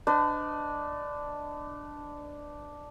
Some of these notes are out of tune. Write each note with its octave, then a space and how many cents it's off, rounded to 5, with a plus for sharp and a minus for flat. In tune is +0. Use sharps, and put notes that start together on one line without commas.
D4 +0 B4 +45 D#5 +0